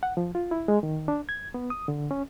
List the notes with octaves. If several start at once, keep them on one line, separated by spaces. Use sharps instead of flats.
F#5
F3
F4
E4
G#3
D#3
D4
G#6
B3
D#6
D3
C#4